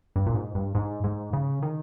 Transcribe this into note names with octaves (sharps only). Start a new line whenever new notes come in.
G2
A#2
G#2
G2
G#2
G#2
C#3
D#3